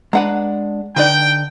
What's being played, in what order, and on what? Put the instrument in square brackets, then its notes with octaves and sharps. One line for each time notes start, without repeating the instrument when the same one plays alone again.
[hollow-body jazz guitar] G#3 D4 [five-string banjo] B4 F#5 A#5
[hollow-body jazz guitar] D3 [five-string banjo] D#4 B4 D5 [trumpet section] G5